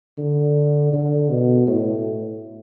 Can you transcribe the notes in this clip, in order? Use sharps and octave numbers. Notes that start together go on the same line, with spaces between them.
D3
D3
B2
A2